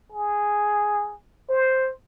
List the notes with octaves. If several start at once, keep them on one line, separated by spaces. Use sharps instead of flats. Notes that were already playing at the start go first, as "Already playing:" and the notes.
G#4
C5